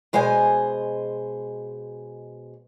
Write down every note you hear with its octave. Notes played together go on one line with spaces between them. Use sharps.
B2 G#3 C5 D#5 G#5